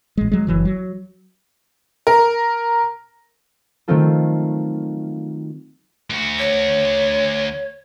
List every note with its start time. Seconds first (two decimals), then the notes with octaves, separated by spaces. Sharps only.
0.17 A1 G#3
0.32 F#3 G#3
0.47 F#1 E3 F#3
0.65 F#3
2.07 A#4
3.88 D#3 F#3 A3 C4 F4 A4
6.10 D2 F#4
6.38 C#5